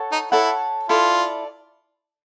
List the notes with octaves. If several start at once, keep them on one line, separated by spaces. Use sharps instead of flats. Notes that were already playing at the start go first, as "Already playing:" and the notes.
Already playing: A4 C#5 F#5 A5
D#4
E4 A4 C#5 F#5 A5
E4 F4 A4 D5